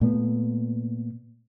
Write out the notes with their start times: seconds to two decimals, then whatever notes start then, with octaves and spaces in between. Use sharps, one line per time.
0.01 A#2 A3 B3